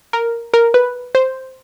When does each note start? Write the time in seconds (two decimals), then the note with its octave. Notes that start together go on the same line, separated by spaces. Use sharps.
0.13 A#4
0.54 A#4
0.74 B4
1.15 C5